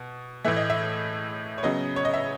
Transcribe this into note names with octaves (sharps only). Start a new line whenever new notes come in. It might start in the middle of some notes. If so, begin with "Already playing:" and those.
Already playing: B2
A2 E3 A3 E5
D#5
E5
C#5
C#3 F#3 B3 D#5
C#5
D#5
E5